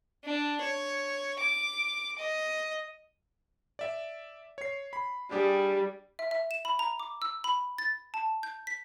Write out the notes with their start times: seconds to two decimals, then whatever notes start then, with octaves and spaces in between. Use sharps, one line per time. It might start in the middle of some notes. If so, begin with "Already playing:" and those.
0.25 D4
0.61 C#5
1.40 D6
2.19 D#5
3.79 D5 E5
4.58 C#5 C7
4.93 B5
5.31 G3 D4 G4 G#4
6.19 E5
6.31 E5
6.51 E7
6.65 B5
6.79 A#5
7.00 D6
7.22 E6
7.44 B5
7.78 A6
8.14 A5
8.43 G6
8.67 B6